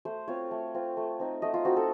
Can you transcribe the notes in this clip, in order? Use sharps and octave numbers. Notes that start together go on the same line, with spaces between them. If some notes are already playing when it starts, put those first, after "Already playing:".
A3 C5
C4 F4 C#5
A3
C4 F4
A3
C4 D#4
A3 D#5
F4
C4 D#4 F#4
A4